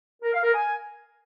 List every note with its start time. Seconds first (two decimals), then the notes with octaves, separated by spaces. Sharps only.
0.22 A#4
0.33 F5
0.43 A#4
0.54 G#5